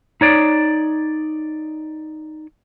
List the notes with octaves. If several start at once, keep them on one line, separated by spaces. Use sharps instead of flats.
D#4 C#5 D5